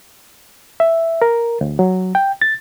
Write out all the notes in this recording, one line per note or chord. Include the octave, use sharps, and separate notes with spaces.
E5
A#4
D2
F#3
G5
A6